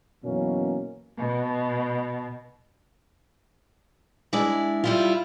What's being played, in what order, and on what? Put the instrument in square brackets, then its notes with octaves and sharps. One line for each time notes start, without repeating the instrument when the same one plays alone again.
[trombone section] F#2 B2 E3 A#3 C#4
[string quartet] B2
[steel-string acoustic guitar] G#3 D4 E4 D5
G3 E4 F4